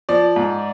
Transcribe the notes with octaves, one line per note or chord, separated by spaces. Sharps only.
F3 D5
G#2